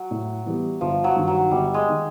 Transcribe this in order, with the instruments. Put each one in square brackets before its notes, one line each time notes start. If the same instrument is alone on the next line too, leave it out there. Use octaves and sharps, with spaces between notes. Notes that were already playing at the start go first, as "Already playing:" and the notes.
Already playing: [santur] F#3
[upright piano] A2
E3 G3 B3
[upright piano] G1 [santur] F3
[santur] F#3
[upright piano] G2 D#3
[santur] F#3
[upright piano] G1 [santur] G3
[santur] G#3
[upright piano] D#3